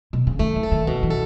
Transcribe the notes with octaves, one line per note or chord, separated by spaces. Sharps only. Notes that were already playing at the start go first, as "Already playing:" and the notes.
B2
C#3
D#3 A3
E3
A4
D#3
B2 E3
E3
A4